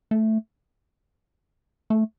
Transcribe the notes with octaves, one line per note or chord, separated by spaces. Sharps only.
A3
A3